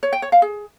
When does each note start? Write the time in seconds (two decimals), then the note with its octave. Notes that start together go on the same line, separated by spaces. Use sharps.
0.03 C#5
0.13 G5
0.22 C#5
0.32 F5
0.42 G#4